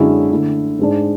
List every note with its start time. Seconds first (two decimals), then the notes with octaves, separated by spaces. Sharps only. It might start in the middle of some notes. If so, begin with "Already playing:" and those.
Already playing: F#2 D3 G#3 C#4 E4
0.31 D3 A3 E4
0.79 G#2 G#3 D4